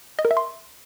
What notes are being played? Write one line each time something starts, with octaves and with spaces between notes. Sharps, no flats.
D#5
A#4
E5
C6